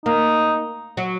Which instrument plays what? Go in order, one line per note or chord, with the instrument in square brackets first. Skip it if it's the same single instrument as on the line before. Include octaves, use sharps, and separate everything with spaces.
[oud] A#3 [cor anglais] D#4
[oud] F#3